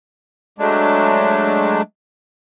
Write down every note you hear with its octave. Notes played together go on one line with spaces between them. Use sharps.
F#3 G#3 A3 D4